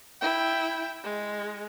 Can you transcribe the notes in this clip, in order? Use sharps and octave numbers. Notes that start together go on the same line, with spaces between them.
E4 G5
G#3